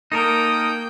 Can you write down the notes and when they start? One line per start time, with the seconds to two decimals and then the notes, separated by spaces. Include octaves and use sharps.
0.12 A#3 D#4 A4 A#4 G5 D#6